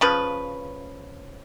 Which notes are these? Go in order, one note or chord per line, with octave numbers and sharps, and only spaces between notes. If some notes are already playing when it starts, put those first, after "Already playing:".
C#3 F3 B4